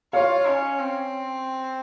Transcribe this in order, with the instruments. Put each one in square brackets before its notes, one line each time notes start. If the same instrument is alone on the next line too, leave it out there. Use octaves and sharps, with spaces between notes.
[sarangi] F4 [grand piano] C#5 F5
[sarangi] C#4
C4